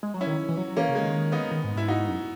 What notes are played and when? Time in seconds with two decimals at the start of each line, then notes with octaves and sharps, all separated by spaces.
0.03 G#3
0.14 F#3
0.21 C#4 E4
0.27 D#3
0.49 E3
0.57 F#3
0.68 F#3
0.77 E3 A#3 C#4
0.88 C#3
0.95 G#3
1.01 D#3
1.32 B3 D#4
1.51 D#3
1.64 G#2
1.76 G#2 E4
1.88 D#4 F#4
2.08 F#2